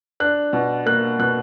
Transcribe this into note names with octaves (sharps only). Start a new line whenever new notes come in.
D4 F#6
B2
A#3 F#6
B2 F#6